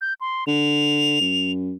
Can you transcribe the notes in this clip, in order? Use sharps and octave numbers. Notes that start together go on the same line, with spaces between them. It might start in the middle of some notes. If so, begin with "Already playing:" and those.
G6
C6
D3 F7
F#2